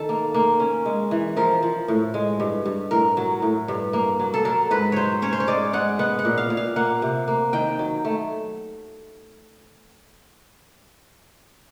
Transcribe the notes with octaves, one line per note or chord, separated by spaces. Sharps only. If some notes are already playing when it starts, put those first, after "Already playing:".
Already playing: D#3 A4
A#3
A#3
C#4
G#3
E3
F3 A#4
F3
A2
G#3
G2
G2
A2 A#4
F#3
A2
G2
A#3
F#3
A4
F#3 A#4
G#2 B4
F#3 C5 C#5
C#4 C#5
C5
C#5
G#3 D5
G#3 F#5
B3 F#5
F#5
A#2
F5
A#2
F5
A#3 F#5
C3
A#3
D#3 G5
F#3
A3